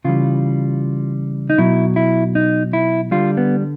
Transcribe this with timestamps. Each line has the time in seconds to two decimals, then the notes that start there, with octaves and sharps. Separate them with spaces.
0.05 C#3 E3 G3 F4
1.50 D#4
1.58 B2 F#3 E4
1.96 E4
2.35 D#4
2.73 E4
3.11 D3 G3 F4
3.37 B3